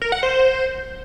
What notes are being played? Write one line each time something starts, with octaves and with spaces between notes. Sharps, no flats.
A#4
F#5
C5